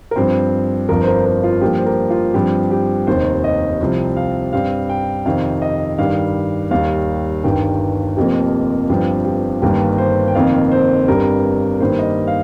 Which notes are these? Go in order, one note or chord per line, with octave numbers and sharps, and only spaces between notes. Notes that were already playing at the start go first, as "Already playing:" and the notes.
A#4
G2 F3 C4 C5
G1 F2 F3 A#4
C5
A#4
A#4
F4
G2 F3 A#3 G4
C5
A#4
F4
G2 F3 C4 G4
G4
F1 D#2 D#3 C5
D#5
C2 C3 F3 C4
F5
G2 G3 C4 F5
G5
F2 C3 D#3 C4 F5
D#5
G2 D#3 G3 F5
D#2 D#3 G3 F5
G1 G2 D#3 G5
F1 F2 F3 A#3 G4
G1 G2 F3 C4 G4
G4
G1 G2 D#3 A#3 G4
C5
G5
F1 F2 D#3 A#3 F5
C5
G1 G2 G3 C4 A#4
G2 D#3 G3 A#3 C5
D#5
F5